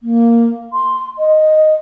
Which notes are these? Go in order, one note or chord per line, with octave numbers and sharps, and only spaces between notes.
A#3
C6
D#5